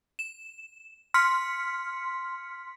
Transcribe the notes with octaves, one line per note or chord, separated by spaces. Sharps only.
E7
C6 F6 B6 C#7